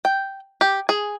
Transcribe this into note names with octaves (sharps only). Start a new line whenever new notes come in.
G5
G4
G#4